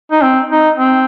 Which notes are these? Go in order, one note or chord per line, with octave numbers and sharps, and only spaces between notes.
D#4
C4
D#4
C4